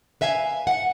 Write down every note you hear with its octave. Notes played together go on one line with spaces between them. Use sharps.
B4 E5 F5 G#5
F#5